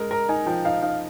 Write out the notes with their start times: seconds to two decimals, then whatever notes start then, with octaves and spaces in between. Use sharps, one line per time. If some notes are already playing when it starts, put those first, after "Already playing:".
Already playing: G#3 A#4
0.11 A#4 A#5
0.29 D#4 G#5
0.46 F3 G5
0.65 D#4 F5
0.82 D#4 F5